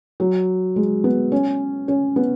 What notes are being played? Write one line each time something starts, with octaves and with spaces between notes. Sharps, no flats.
F#3
G#3
B3
C#4
C#4
B3